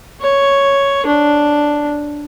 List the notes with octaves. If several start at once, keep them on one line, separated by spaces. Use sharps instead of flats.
C#5
D4